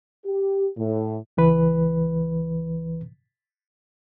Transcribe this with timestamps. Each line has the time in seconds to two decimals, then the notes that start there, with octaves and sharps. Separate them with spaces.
0.25 G4
0.78 A2
1.37 C#2 E3 B4